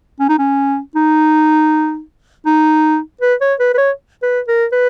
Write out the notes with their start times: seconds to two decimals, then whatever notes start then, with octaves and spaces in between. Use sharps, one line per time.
0.19 C#4
0.29 D#4
0.38 C#4
0.95 D#4
2.46 D#4
3.21 B4
3.41 C#5
3.59 B4
3.74 B4
3.78 C#5
4.22 B4
4.48 A#4
4.72 B4